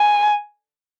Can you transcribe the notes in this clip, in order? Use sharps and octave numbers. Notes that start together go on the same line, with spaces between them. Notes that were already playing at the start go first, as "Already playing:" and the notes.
Already playing: G#5